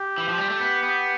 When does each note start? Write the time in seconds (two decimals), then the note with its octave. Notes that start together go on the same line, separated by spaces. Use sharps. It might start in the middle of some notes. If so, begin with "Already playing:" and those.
Already playing: G4
0.18 E3
0.29 F3
0.38 G3
0.49 A3
0.60 B3
0.83 B3